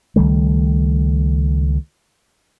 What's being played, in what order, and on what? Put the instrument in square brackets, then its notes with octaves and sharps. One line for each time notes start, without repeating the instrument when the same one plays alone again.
[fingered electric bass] C#2 D#3 G3 A3